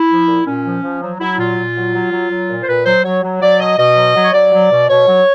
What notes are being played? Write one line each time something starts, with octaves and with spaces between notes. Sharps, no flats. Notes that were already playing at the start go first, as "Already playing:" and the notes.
Already playing: E4
F3
A#2
A#2 C#4
F3
F3
F#3
F#3 E4
A#2 F4
A#2
F#3
F#3
F#3
F#3
A#2
C5
A#2 B4
F#3 C5
F#3 C#5
F#3
F#3 D5
B2 D#5
B2 D#5
F#3
F#3
C#5
F#3 D5
F#3
B2
B2 C#5
F#3